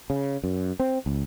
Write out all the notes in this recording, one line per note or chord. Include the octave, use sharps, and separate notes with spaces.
C#3
F#2
C4
C#2